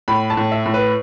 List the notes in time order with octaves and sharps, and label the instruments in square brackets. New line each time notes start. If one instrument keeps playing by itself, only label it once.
[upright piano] A2 B5
A5
A2
E5
A2
B4